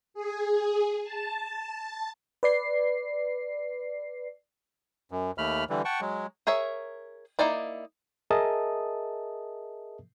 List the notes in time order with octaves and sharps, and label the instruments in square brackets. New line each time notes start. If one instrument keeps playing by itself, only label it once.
[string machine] G#4
A5
[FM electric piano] B4 D5 C7
[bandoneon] F#2
D#2 A3 B5 F6
D3 E3 G3
F#5 G5 A5 C#6
F#3 G#3
[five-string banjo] G#4 A#4 C#5 E5
A#3 D#4 E4 D5 A#5
[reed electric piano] G#4 A#4 D#5 E5 A5 D#6